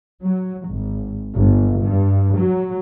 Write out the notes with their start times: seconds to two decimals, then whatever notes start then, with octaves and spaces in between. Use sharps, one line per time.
0.20 F#3
0.65 G#1
1.35 G1
1.81 G2
2.36 F#3